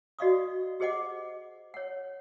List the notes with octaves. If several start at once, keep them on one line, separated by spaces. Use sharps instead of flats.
F#4 D5 D#5 F5 C#6 D#6
G4 G#4 C5 D#5 F#5 D6
C#5 F#5